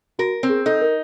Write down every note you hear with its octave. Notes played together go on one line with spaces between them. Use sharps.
F#4 A#4
C4
G#4
D#4 A4
A#4